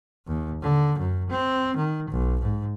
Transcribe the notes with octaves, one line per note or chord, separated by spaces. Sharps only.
D#2
D3
F#2
C4
D#3
B1
G#2